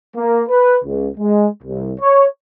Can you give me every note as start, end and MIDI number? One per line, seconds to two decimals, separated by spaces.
0.16 0.43 58
0.48 0.77 71
0.85 1.09 37
1.17 1.47 56
1.63 1.92 36
1.99 2.25 73